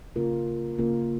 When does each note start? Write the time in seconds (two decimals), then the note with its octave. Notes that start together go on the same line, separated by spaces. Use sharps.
0.16 C#3 A#3 F4 A#4
0.78 C#3 A#3 F4 A#4